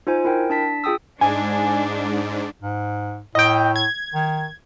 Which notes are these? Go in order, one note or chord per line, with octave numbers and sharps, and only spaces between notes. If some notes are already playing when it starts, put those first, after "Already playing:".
D#4 F4 C5 G#5
E4 A#4 G5
D4 A5 B6
F4 G#4 G5 D#6 E6
G#2 D4 G#5
G#2
A2 D#5 G5
G#6
D#3